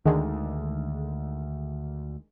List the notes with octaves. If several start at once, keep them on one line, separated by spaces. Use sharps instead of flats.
D2 D3 D#3 G#3